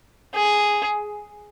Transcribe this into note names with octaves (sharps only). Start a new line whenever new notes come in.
G#4